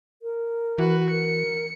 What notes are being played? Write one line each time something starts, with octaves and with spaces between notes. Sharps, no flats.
A#4
E3 F#4 B4
A#4 C#7